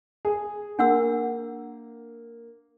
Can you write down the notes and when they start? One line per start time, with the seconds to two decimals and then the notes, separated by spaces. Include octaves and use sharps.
0.25 G#4
0.79 A#3 D4 F#5 E6